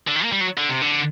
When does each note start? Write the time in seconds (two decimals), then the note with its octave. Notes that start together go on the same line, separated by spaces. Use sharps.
0.08 D3
0.16 D#3
0.24 A#3
0.32 G3
0.41 F#3
0.57 D3
0.69 C3
0.82 D3